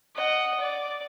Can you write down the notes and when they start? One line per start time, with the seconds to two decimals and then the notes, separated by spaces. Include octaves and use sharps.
0.16 D#5 F#5
0.60 D5